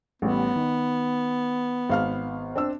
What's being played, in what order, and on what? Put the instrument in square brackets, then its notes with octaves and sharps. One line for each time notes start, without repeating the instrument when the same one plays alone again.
[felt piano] A1 G3 [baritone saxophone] B3
[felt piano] D#3
G#1 F5 F6
C4 D4 E6